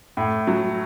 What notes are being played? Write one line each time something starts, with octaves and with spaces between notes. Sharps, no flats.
A2
F#3